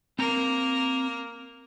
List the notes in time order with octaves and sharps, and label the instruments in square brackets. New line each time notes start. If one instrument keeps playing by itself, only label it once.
[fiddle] A#3 A#4 [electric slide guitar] C4 A#5